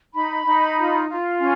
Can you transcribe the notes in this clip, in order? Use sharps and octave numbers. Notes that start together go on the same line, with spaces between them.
D#4 B5
D#4
F4
F4
C#4 G#5